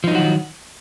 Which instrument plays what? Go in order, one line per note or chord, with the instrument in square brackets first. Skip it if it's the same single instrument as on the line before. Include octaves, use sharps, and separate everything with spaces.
[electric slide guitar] F3
D#4
F#3
F#4
D#3